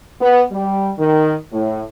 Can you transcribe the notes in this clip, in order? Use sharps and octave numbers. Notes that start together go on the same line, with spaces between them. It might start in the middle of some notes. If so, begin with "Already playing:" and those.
B3
G3
D#3
A2